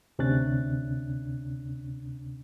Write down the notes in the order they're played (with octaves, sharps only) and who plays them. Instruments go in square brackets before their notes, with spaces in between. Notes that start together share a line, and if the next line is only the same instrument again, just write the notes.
[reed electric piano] D2 C3 C#4 D4 F#6 A6